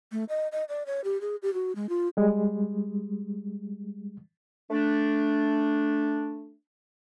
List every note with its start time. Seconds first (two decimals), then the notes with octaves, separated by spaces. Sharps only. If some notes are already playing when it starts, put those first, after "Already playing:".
0.12 A3
0.29 D#5
0.52 D#5
0.69 D5
0.86 C#5
1.04 G4
1.21 G#4
1.43 G4
1.54 F#4
1.76 G#3
1.89 F4
2.17 G3 G#3
4.70 A3 D4